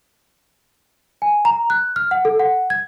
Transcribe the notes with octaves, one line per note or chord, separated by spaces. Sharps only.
G#5
A#5
F#6
F6
F#5
A4
F#5
G#6